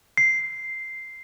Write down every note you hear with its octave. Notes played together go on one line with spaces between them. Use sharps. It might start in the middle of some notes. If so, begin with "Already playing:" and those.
C7